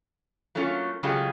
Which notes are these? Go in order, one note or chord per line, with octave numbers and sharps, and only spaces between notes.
F#3 A3 A#3 C#4 F4
C#3 F#3 G#3 A3 F4 G4